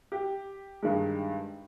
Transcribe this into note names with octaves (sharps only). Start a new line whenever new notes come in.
G4
G2 D#3 G#3